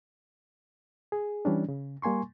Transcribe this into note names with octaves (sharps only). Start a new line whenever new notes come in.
G#4
E3 G3 C#4 D4
C#3
G3 A#3 G#5 C6 C#6